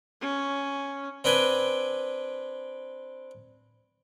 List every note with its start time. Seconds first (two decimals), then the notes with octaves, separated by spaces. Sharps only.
0.21 C#4
1.24 C4 D4 B4 G5 G#5